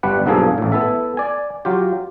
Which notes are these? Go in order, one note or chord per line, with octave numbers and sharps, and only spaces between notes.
G1 G3 D4 B4 F#5
B1 G2 F3 A#3 G#4 A4
A1 A2
B3 E4 A4 E5
D5 G#5
F#3 F4 G4